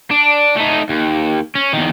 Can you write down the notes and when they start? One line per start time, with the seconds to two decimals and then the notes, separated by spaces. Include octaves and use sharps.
0.11 D4
0.56 A3 D#4
0.89 D#2
1.55 C#4
1.73 E2 D#3